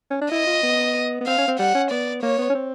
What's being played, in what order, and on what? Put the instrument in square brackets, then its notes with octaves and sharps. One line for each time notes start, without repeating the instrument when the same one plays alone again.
[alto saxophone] C#4
D4
[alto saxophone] E4 [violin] D#5
[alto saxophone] F4
B3
B3
[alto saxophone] C4 [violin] F5
[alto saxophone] C#4
C4
[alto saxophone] G3 [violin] F#5
[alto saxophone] C#4
[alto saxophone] B3 [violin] D5
[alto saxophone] A#3 [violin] C#5
[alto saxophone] B3
C#4
C4